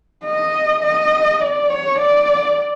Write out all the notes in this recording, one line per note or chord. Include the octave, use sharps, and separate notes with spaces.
D#5
D#5
D5
C#5
D5